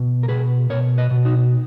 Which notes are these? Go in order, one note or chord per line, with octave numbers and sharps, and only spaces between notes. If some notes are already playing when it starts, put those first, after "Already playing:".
Already playing: B2
A#4
B2 G#4 B4
B2 A#4 C#5
B4 D#5
B2
D#4 F#4